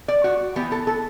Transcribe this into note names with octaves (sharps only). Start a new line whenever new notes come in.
D5
F#4
E3 B3 G4
A4
A4